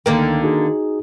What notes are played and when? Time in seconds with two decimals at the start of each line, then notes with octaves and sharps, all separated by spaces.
0.06 D2 D3 D#3 A#3 A#4 G5
0.42 D#4 F#4 G#4